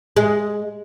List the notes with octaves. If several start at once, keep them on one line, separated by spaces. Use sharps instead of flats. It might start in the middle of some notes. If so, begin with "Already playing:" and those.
G#3